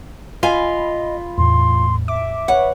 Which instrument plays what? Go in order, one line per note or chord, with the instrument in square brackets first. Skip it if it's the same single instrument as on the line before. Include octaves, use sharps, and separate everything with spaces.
[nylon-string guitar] F4 F5 G#5 [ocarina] D#5 [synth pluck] B5
[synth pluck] E2 A2 [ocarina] C6
[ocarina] E5 [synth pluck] D6
[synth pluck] B4 C#5 [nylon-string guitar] F#5